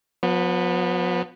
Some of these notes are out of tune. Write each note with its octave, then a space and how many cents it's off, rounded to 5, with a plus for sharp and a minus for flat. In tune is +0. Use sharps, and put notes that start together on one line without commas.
F3 +45 B3 +0